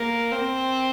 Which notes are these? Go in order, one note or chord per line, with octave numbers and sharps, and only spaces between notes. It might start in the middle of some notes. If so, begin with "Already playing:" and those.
Already playing: A#3
C4